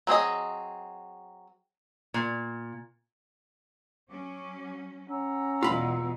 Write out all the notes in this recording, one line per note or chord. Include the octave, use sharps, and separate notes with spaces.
F#3 C4 G#4 D#5
A#2
F#3 C#4 D6
C#4 F#5 A#5 E6
E2 B2 G#3 F4 B5